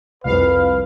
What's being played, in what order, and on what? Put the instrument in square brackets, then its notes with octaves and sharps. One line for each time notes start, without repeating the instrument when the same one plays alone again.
[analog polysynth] C2 F5 [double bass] F2 [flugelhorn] B4